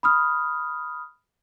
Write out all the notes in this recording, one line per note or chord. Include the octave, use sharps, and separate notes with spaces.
B5 D#6 F6